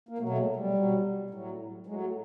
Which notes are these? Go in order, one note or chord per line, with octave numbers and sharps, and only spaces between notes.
A#3
B2 F#3 A3
A3
G#3
G3
B2 F#3
A2 F#3
A2 F#3 G#3